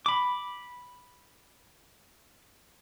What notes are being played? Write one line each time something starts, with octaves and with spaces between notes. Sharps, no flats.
B5 D6